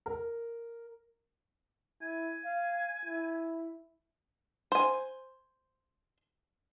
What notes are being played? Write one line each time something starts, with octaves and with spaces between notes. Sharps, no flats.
A#4
E4 G#5
F5
E4
C5 G#5